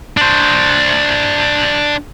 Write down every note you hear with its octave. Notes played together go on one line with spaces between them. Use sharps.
D4 C5